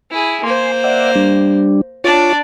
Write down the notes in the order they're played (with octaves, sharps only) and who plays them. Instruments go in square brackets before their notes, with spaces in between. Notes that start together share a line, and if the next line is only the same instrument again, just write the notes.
[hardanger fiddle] E4 G#4
[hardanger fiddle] A#3 C5 [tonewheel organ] G#5 C6
[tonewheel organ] D5 E5 F#5
G3 D4
[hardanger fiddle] D4 D5 [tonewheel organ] F4 C#5